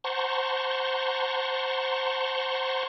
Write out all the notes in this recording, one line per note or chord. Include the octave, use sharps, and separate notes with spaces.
C5 F#5 A5 A#5 C6 C#6